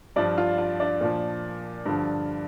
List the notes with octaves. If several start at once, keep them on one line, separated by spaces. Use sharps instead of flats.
G2 F3 D4
F4
F4
D4
A#2 F3
G2 D3 F3